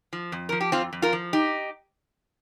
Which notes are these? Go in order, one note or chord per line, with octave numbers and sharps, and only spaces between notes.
F3
F2
F3 A#4
G4
F2 C4 F4
F2
F4 A#4
F3
D#4 G4